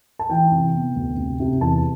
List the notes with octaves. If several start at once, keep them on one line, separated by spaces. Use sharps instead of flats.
A5
E3 G5
C3
B3
D2
C3
C3
E2 A5